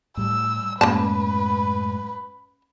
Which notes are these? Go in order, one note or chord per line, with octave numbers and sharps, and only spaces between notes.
A2 G3 E6
F#2 A2 G#3 A#3 C#4 B4 A5